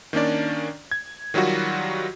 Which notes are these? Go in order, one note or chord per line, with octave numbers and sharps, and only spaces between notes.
D#3 A#3 C#4 D4 D5
G#6
D#3 F#3 G3 F4 F#4